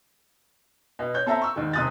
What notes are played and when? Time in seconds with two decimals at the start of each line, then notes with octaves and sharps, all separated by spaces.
0.99 B2
1.14 C#5 G6
1.26 C4 A4 E5 A#5
1.42 C#6 E6
1.56 D#2 G#2 D#3
1.73 D#1 C3 D#6 F#6 A6